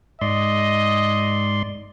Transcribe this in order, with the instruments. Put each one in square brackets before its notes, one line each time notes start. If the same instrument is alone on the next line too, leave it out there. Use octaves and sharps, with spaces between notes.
[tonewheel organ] G#2 D5 C6 [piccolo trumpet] D#5